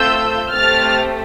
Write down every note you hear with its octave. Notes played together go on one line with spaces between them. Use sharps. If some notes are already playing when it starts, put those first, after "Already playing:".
Already playing: A3 C4 F4 A4 E6 G6
A3 C4 G4 F6 A6